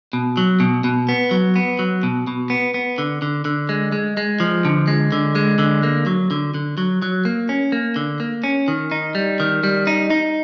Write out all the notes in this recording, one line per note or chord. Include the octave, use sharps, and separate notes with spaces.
B2
F#3
B2
B2
B3
F#3
B3
F#3
B2
B2
B3
B3
D3
D3
D3
G#3
G#3
G#3
F3
D3
G#3
D3
G#3
D3
A#3
F#3
D3
D3
F#3
F#3
A#3
C#4
A#3
D3
A#3
C#4
D#3
D#4
G3
D#3
G3
D#4
D#4